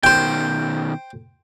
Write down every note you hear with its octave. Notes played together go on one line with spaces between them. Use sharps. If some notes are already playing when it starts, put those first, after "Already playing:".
B2 D#3 C5 G5